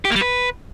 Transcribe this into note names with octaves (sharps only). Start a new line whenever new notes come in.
G4
A#3
G3
B4